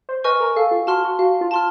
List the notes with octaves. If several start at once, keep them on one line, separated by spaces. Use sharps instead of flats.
C5
B4 D#5 G#5 C#6 F6
A#4
A4 F5
F4
F#4 A5 C6 F6
F#4
F#4 F5
F4
A5 C6 F6